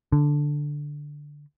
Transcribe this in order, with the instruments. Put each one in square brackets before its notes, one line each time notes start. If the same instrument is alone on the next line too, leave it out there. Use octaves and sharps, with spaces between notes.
[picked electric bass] D3